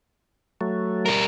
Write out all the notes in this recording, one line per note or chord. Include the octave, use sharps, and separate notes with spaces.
F#3 A3
G3 A#4